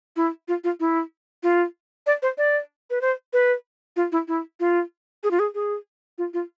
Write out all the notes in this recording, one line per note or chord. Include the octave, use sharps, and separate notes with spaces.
E4
F4
F4
E4
F4
D5
C5
D5
B4
C5
B4
F4
E4
E4
F4
G#4
F4
G#4
G#4
F4
F4